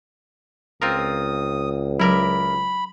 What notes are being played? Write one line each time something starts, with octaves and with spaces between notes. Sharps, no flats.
C#2 C4 F4 A#4 D#6
F#3 E4 A#4 D5 B5